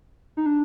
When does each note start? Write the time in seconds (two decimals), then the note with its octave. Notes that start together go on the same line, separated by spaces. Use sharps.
0.37 D#4
0.46 D4